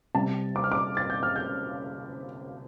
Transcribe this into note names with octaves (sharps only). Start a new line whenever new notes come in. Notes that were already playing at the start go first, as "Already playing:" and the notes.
C3 G3 A5
D6
F6
D6
A6
G6
F6
G6